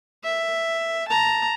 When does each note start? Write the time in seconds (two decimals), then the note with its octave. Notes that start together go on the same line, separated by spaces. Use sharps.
0.23 E5
1.09 A5 A#5